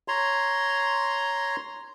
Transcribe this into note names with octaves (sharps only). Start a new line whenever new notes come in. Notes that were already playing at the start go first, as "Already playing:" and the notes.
C#5 A#5 C6